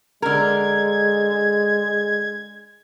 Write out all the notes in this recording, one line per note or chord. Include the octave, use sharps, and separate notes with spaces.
D3 G#3 A#4 G#6